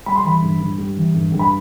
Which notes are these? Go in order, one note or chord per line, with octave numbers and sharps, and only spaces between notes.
G3 B5
C6
E3 B5
G2
G2
G3
E3
G2
G2
B5